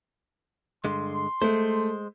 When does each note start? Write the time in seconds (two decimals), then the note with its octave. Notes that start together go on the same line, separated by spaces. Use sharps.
0.85 G2 D3 G#3 C6
1.42 G#3 A3 C5